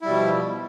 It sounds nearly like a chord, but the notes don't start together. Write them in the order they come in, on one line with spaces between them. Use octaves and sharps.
E4 G3 B2 F3